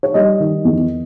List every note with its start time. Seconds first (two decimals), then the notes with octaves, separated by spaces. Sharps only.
0.03 C#5
0.14 G3 D#5
0.40 D#3
0.65 E2